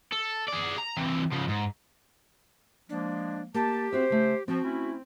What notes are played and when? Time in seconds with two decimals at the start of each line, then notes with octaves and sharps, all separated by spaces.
0.12 A4
0.48 G#4 D5
0.78 A#5
0.97 E3 C4
1.33 C#3 F3
1.49 G#2
2.89 F3 G#3 A#3 D4
3.54 A#3 G4 A5
3.93 C4 F#4 C5 E5
4.10 C#3 A3
4.48 F3 C4 F#4
4.64 A3 C#4 E4